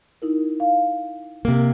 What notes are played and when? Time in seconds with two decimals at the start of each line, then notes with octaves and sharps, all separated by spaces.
0.22 D#4 E4 A#4
0.60 F5
1.45 C3 A#3